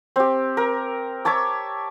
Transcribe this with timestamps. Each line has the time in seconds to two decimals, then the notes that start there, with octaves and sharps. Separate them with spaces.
0.16 C4 G4
0.57 A#4
1.25 C#5 E5 A5 D6